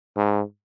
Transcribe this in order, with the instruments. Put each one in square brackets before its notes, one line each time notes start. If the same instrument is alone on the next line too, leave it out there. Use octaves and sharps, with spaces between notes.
[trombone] G#2